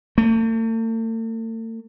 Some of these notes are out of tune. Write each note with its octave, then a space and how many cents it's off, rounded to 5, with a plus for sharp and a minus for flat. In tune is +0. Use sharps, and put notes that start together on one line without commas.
A3 +45